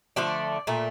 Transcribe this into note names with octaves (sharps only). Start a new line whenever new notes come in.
D3 F3 A3 D5
A#2 A3